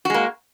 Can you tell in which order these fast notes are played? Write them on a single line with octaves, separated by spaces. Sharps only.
F#4 G#3 A#3